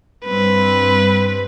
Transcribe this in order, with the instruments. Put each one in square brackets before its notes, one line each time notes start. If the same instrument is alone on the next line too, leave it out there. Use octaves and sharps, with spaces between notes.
[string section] G2 C4 [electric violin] B4